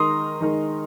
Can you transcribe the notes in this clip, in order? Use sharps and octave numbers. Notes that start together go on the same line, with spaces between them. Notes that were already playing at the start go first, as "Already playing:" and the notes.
Already playing: D#3 G#3 D#4 A#4 C6 D#6
D#3 G#3 D#4 A#4